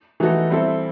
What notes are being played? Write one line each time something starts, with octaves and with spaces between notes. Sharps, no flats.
E3 A3 D#4 F#4 A4
G3 C4 E4 A4